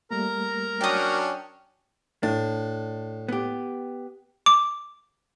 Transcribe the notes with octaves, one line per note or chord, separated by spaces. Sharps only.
G3 A3 A#3 A#4 A#5
F#3 C#4 D4 G5 D#6
A2 D4
B3 G4
D6